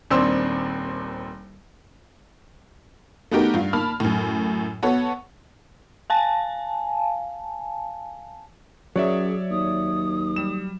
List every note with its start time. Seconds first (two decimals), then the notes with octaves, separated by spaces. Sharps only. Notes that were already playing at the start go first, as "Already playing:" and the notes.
0.11 D#1 D#2 C4 D4 C6 E6
3.31 A3 B3 D#4 F#4 G4 A#4
3.54 G2 F4
3.73 A#3 A5 B5 F6
4.00 F#2 A2
4.83 B3 F#4 A4 C#5
6.10 F5 G#5 A5
8.96 F#2 F#3 G#4 C#5 D5 E5
9.51 D#2 D#6
10.36 G3 E7